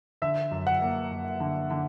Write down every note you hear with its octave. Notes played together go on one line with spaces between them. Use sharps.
D3 E5
F#2
F#5
A#3
F#2
D3
D3